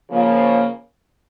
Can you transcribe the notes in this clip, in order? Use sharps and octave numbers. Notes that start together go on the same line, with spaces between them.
C#3 F3 A#3